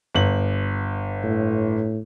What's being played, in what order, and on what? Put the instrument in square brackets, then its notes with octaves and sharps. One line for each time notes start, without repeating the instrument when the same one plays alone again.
[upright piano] G1 F#7
[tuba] A2